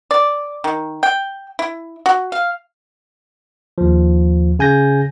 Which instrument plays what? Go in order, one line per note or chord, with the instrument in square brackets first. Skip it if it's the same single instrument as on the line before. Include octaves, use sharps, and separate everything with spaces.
[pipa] D5
D#3
G5
E4
F#4
F5
[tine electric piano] D#2 F3
C#3 G#5 G6 A#6